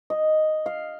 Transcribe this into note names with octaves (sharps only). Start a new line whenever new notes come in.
D#5
F5